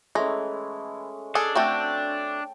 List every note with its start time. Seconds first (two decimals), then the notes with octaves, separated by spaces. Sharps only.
0.15 E3 G#3 A3 C#4 A#5
1.35 D4 G#4 A4
1.56 A3 C4 F#4 G5 A5